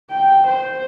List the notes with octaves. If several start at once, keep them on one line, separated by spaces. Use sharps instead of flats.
G5
C5